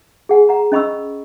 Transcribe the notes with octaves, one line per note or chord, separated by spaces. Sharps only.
G#4 F#5 G#5
F#5 A#5
C#4 D#5 B5 C#6 E6